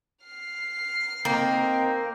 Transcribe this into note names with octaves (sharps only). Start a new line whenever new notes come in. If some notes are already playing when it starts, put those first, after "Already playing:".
F6 C7
A#3 C4 D#4 G5